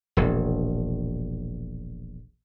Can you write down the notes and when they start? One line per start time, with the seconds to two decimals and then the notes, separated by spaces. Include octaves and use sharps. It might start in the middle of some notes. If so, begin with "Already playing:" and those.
0.17 E1 A#1